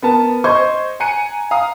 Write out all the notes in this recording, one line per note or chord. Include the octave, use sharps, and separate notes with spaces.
B3 A#4 A5
C5 D#5 C6 C#6 G#6
G#5 A#5 F#6 C#7 D#7
F5 A#5 D#6